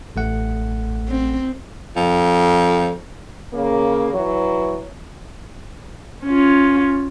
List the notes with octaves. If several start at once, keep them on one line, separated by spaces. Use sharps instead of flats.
A1 A3 F#5
C4
F2
C#3 A#3
E3 F#3
C#4 F4